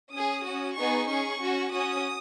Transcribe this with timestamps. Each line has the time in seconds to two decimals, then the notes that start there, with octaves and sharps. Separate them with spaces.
0.13 C#4 D#6
0.18 G#4
0.45 C#4 F#4
0.76 B3 D#4 G#4 C#6
1.08 C#4 G#4 C#6
1.40 C#4 F#4
1.72 C#4 F#4 D#6